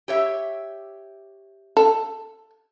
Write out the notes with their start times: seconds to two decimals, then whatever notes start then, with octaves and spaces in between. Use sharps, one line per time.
0.08 G4 C#5 E5
1.77 A4